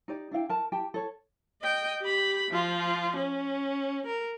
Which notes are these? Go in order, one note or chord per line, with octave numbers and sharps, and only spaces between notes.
D#4 G4 D5
D4 E4 F5 G5
A#4 A5
G4 G5 A5
A4 C#5
D#5 G5
G4 B5
F3 F4
C#4
A#4